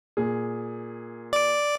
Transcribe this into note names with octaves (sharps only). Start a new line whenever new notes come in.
A#2 G#4
D5 D6